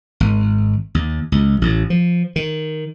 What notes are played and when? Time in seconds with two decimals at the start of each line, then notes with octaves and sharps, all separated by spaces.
0.20 G#1
0.95 D#2
1.32 C#2
1.61 A1
1.90 F3
2.36 D#3